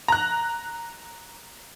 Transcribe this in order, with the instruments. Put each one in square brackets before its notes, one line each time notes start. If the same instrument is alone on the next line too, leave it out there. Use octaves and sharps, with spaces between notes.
[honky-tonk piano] A#5 F#6